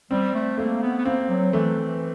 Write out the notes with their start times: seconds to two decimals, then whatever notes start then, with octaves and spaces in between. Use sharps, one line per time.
0.11 G3 C4
0.34 A3
0.58 A3 A#3
0.82 B3
0.97 B3
1.05 A#3 C4
1.29 F#3
1.53 E3 A3
1.77 E3